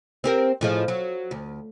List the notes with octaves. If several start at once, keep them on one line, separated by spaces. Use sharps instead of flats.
C4 G4 A#4
A2 F3 G#3
F#3
D2